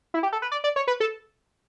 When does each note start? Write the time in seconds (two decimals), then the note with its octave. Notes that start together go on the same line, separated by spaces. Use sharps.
0.14 E4
0.23 G4
0.33 A4
0.42 B4
0.52 D5
0.64 D5
0.76 C#5
0.87 B4
1.00 A4